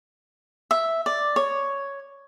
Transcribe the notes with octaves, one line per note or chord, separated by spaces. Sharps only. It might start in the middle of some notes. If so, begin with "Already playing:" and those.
E5
D5
C#5